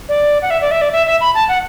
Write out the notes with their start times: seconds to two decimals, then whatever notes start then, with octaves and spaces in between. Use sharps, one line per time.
0.09 D5
0.42 F#5
0.50 E5
0.61 D5
0.71 E5
0.81 D5
0.93 E5
1.06 E5
1.21 B5
1.35 A5
1.49 F#5